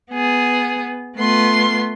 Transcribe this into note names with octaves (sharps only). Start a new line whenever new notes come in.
B3 G#4
A3 B3 F4 B4 C6